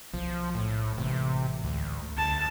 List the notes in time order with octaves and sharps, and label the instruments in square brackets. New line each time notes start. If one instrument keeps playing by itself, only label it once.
[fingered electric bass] B1 [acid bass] F3
[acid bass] A2
[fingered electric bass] A1 G#2 [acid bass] C3
[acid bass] D2
[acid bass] D2 [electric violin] A5